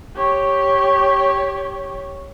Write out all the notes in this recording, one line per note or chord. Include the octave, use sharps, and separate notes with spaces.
G4 C#5